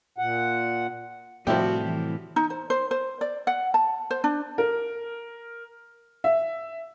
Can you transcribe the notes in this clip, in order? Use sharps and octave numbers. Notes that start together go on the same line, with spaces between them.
A#2 F#5
A2 C3 F3 G3 E4 F#4 G4
E3
D#4
C5
C5
C5
D5
F#5
A5
C5
D4
A#4
E5